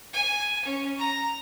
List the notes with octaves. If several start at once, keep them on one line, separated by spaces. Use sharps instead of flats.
G#5
C#4
A#5